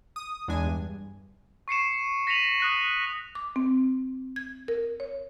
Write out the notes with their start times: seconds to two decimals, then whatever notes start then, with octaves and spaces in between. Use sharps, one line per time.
0.16 D#6
0.48 E2 G#3 D4 G#5
0.65 G2
1.68 C#6 C7 C#7 E7
2.27 A#6 B6 C#7 D#7 F7 F#7
2.60 D#6 F#6 A#6
3.35 D6
3.56 C4
4.36 G#6
4.68 A#4
5.00 C#5